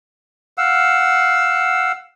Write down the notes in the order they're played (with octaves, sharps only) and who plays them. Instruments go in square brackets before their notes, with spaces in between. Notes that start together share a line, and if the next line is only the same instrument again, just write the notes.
[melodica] F5 F#5 E6